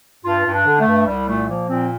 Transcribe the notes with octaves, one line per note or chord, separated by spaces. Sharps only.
G2 F4
G2
D4
D3
A3
G2
C2 G3
A#2 A3
F3 A#3
A#2 C4